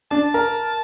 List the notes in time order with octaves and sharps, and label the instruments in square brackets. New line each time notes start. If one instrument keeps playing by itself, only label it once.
[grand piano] D4 [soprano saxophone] A5
[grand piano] A#4